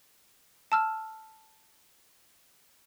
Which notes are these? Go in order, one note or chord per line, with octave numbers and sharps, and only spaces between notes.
A5 E6 F6